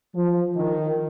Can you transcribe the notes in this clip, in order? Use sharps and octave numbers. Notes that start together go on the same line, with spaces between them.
F3
D#3